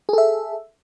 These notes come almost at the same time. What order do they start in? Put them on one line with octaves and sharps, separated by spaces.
G#4 A4 E5